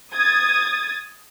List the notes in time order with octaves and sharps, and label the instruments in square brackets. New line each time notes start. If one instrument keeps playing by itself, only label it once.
[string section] D#6 G#6 A6